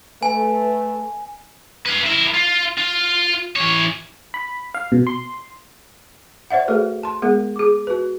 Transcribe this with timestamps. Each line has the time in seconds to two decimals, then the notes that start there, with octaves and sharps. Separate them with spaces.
0.23 A3 B4 G#5
1.86 B4 F5
2.06 E4 A#4
2.34 F4
2.78 F4
3.56 E3 C#5
4.34 B5
4.74 F5
4.92 B2
5.07 C6
6.50 C5 D5 E5 F#5
6.68 A3 F#4 G#4 A4 B4
7.03 A5 C6
7.22 G#3 B3 G#4 A#4 F#5
7.56 G#4 D6
7.87 F#4 B4